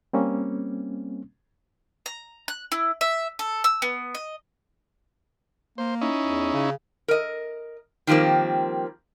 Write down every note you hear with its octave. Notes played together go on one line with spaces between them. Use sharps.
G3 A#3 C4 C#4
A#5
F#6
E4
E5
A4
E6
B3
D#5
A#3 C5
C#4 D#4 E4
E2
C#3
A#4 D#5
D#3 F3 G3 A#3 C4